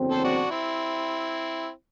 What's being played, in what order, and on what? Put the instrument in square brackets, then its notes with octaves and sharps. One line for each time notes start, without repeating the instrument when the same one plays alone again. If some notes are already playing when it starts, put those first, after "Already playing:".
Already playing: [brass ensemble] F#1 E2 D3 F#3 C4
[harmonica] A4 C5
D4 F#4
C4 E4